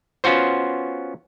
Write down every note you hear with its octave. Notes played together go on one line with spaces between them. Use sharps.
B3 C#4 F4 F#4 C5